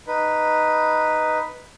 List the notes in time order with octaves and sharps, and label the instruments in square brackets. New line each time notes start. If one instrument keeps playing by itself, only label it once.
[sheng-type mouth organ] D#4 B4